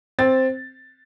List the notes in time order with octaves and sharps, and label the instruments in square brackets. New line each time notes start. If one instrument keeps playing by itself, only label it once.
[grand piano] C4 A6